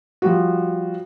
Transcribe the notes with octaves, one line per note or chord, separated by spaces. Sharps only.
F3 G3 F#4